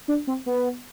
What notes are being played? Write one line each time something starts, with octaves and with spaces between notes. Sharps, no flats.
D4
C4
B3